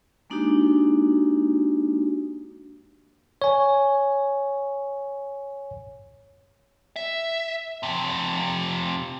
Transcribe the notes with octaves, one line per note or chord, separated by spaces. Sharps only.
G#3 A#3 D4 D#4 F#4 G4
C#5 G#5
E5
F2 C3